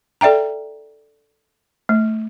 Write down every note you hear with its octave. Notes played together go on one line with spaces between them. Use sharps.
A4 D5 E5 G5 A#5
A3